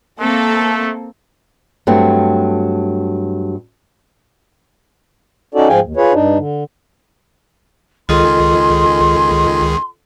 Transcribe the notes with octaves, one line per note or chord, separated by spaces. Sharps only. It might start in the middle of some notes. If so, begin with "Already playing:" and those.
A3 A#3 C4 A4
G2 F#3 A3 C4
C#4 D#4 F#4 A4 D5
G#2 F3 G#4 F5 G5 G#5
D#2
F4 G#4 B4 C#5
G2 D4 D#4
D3
C#2 D#3 F4 G#4 A4 D#5 C6